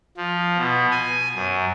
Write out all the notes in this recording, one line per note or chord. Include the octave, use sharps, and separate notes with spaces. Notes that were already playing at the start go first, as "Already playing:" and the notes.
F3
B2
G#5
F#2